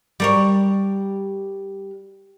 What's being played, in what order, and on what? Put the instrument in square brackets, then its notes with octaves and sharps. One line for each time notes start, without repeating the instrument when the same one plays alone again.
[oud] G3 A#4 C#5